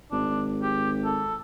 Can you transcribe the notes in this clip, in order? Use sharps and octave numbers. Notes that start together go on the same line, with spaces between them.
G#1 D4
G4
A4